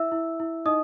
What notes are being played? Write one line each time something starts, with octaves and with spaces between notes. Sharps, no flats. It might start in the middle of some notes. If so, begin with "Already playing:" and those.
Already playing: E4 E5 E6
E4
E4
D#4 D#5 D#6